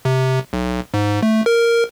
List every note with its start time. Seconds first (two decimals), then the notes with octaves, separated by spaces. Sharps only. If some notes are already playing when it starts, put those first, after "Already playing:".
0.05 C3
0.53 B1
0.94 G#2
1.23 A3
1.46 A#4